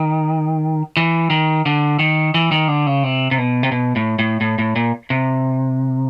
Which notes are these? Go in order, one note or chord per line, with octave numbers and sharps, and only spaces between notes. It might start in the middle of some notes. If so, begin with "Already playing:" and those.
Already playing: D#3
E3
D#3
D3
D#3
E3
D#3
D3
C#3
C3
C3
B2
C3
B2
A2
A2
A2
A2
A#2
C3